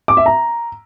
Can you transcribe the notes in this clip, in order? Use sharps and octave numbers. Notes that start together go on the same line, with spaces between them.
D6
E5
A#5